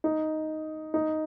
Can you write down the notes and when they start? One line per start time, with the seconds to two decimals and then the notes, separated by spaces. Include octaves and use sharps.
0.04 D#4
0.94 D#4